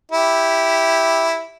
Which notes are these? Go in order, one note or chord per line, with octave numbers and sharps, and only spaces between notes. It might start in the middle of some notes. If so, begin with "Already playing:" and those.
E4 G4